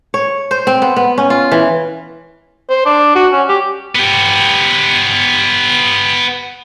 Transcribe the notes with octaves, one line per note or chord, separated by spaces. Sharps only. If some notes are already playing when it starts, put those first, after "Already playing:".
C#5
C5
C4
B3
B3
C#4
F4
E3
C5
D4
F#4
C#4
G4
B3 G4